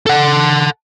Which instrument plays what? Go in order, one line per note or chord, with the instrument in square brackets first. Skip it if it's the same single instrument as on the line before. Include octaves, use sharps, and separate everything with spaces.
[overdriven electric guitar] A4 F#5